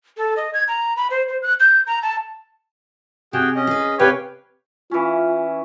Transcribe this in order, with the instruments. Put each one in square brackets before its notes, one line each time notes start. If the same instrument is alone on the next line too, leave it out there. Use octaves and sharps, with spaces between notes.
[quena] A4
D#5
G#6
A#5
B5
C5
C5
F#6
G6
A#5
A5
[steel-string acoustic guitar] C3 [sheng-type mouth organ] F#4 G#4 G5
[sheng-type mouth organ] C#4 D#5
[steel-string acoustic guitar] G#4 B4
[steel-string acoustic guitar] C3 [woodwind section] G4 B4 C#5 [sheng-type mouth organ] F5 G5 G#5
[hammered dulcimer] E3 C#4 [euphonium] F4